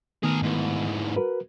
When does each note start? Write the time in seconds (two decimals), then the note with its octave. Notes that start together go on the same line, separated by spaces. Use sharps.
0.23 D#3 A3 B3 G#4 A#4
0.43 G#2 E3
1.16 F#4 A#4 B4